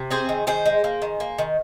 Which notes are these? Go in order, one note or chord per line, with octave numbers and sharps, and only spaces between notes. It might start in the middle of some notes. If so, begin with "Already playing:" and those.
Already playing: C3
C4 G#4 C5
D#3
D#3 G#4 C5
G#3
A#3
D#3
A#3
D#3